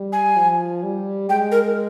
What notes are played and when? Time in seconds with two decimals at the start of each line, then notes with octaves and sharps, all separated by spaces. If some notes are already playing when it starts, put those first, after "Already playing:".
Already playing: G3
0.13 G#5
0.36 F3
0.83 G3
1.29 G#3 G5
1.52 A#4